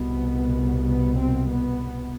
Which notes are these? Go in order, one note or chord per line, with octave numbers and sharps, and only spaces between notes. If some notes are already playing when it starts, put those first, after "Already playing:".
Already playing: C2 B2 B3
B3
C4
B3